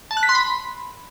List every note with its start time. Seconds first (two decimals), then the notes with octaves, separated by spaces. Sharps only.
0.11 A5
0.17 F#6
0.23 B6
0.29 C6
0.35 B5